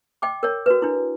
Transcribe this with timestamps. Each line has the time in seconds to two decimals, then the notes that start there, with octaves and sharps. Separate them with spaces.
0.22 D#5 G5 D6
0.43 A#4 C#5
0.66 F#4 B4
0.82 D4 E4